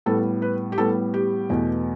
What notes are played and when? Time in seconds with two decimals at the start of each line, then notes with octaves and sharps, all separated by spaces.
0.06 A2 G3 B3 A4
0.42 B4
0.72 G4
0.78 A2 G3 B3 A4
1.14 G4
1.49 E2 B2 A3